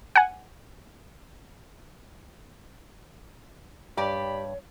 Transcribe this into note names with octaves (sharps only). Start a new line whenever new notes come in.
F#5 G#5
G2 G4 C#5 D5 B5